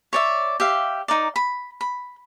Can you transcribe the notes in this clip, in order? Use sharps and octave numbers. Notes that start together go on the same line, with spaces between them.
C#5 D5 E5
G4 E5 F5
D#4 A#4 D5
B5
B5